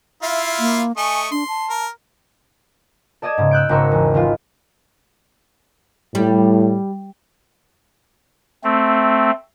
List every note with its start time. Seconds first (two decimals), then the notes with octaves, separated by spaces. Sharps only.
0.23 E4 F4 E5 F5
0.60 A#3
0.97 A3 D#5 G#5 C#6
1.31 D4 C6
1.48 A5
1.70 A#4
3.22 A4 D5 D#5 D#6 G#6 E7
3.38 G#2 C#3
3.51 E6 F#6 G6 D7
3.69 G#1 C#3 A#4 C#6 E6
3.92 E2
4.14 D#3 G#3 E4 F4 B4
6.15 A2 G3
8.64 A3 C4